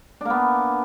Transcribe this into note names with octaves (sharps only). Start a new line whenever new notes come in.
A#3 B3 D4